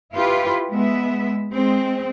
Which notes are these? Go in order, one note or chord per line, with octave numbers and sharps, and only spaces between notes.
E4 F4 G4 B4
G#3 B3 E5
G#3 C4